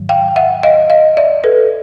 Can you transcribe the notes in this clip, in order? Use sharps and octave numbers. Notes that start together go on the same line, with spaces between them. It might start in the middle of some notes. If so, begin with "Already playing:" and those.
Already playing: G#2 D#3 F#3
F5 G5
E5 F#5
D#5 F5
D#5 F5
D5 E5
A4 B4